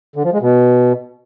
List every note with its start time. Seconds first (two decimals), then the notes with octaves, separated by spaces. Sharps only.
0.16 D3
0.24 F3
0.33 G#3
0.41 B2